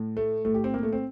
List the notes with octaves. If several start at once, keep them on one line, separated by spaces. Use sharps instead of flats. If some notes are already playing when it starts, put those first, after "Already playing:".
Already playing: A2
A3
A2 A3
G4
C4
A#3
A3
C4